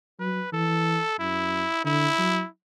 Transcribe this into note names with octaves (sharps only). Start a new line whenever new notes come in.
F#3 B4
E3 A4
F#2 E4
D3 E4
F#3